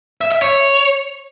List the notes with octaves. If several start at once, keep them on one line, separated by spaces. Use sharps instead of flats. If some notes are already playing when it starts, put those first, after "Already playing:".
E5
E5
C#5